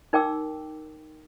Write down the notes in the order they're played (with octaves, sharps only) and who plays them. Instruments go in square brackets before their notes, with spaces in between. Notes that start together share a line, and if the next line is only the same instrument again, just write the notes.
[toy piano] D#4 A#4 G5 D6 E6